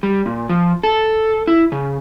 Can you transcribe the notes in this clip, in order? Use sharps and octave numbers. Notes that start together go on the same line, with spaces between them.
G3
A#2
F3
A4
E4
C#3